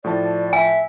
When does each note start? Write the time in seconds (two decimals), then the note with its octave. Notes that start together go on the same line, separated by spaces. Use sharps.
0.04 A2 F3 D5 A5
0.53 E5 G#5